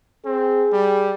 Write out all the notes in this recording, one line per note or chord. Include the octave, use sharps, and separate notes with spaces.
C4 G#4
G3